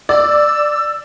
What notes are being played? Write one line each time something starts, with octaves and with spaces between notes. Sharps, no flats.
D5 E6